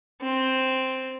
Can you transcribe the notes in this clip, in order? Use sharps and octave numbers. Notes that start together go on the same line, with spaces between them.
C4